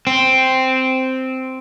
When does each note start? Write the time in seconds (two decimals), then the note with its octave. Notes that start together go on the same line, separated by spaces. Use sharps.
0.07 C4